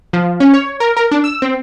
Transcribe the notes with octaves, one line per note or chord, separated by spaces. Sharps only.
F3
C#4
C#5
A#4
A#4
D4
E6
C4